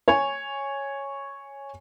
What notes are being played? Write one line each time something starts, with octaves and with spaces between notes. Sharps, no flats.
C#5 G#5